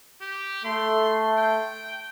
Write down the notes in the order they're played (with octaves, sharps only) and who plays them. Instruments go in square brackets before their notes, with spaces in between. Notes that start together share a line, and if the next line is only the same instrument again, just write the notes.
[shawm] G4
[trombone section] A3 [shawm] C6
[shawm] G5